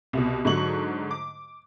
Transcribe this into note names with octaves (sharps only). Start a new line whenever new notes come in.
C2 B2
G#2 D3 F#3 D#4 C#6 F#7
D6